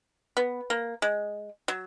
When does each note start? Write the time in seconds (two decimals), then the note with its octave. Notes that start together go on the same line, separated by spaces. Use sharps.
0.37 B3
0.70 A#3
1.02 G#3
1.68 F#3